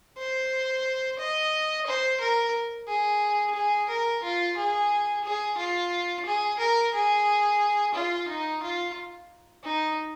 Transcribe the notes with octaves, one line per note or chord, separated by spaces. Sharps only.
C5
D#5
C5
A#4
G#4
G#4
A#4
F4
G#4
G#4
F4
G#4
A#4
G#4
F4
D#4
F4
D#4